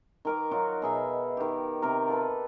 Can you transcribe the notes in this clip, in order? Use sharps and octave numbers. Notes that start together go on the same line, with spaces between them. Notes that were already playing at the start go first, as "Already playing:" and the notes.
D#3 A#4 D6
F#3 D#4 F4 F#4
B2 G#4 E5
D#3 G4
C3 A#4
F4 A4 B4